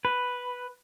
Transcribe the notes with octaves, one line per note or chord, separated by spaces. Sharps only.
B4